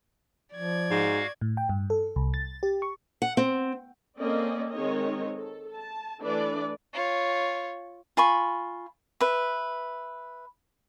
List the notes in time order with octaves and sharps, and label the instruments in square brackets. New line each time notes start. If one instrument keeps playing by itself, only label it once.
[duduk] F3 [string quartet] D5 G#6
[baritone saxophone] G#2 [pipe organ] F#4 F5
[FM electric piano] A2
G5
G2
A4
C2
A6
G4
C#6
[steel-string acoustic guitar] F#5
C4
[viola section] A#3 C4 C#4 A4 D5 D#5
D#3 G#3 C4 D#4 C#5 D#5
A4
A5
E3 A3 D4 A4 B4 D5
[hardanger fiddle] F4 C#5
[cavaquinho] F4 G#5 B5 C#6
B4 E5